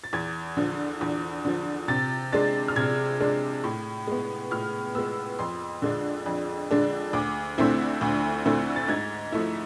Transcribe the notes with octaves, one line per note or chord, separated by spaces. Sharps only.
A6
E2 G#6
D3 F3
E2
D3 F3
C3 A6
G#3 D4 A6
F6
C3 G#6
G#3 D4
A2
G#3 B3
A2 F6
G#3 B3 E6
F2 C6
D3 G#3 D4
F2
D3 G#3 D4
D2 D6
D3 A3 C4 E4
D2
D3 A3 C4 E4
A6
G#2 G#6
F3 A3 E4